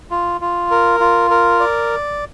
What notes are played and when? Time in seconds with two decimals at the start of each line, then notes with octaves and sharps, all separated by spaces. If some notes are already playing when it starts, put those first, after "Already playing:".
0.11 F4
0.41 F4
0.71 A#4
1.00 F4
1.31 A#4
1.60 D5